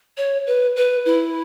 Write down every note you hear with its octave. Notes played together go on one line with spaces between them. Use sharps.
C#5
B4
B4
E4